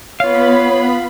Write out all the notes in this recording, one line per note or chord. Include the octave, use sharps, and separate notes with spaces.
B3 F4 C#5 F5 B5